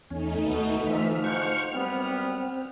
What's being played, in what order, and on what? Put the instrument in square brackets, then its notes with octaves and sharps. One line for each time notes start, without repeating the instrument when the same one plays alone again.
[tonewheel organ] E2 C#4 [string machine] A3 D#4
[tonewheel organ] D#2 [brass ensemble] B2
[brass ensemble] D2 G#2 F3 [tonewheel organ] E3 E5 [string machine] F6
[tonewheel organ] C5 F#5 C#6
[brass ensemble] F#2 G3 B3 [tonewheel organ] C4